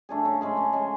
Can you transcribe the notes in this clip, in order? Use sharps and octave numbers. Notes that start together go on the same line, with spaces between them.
A3 D4 G#4
C#3
G#3 C#4 G#4
C#3
G#3 C#4 G#4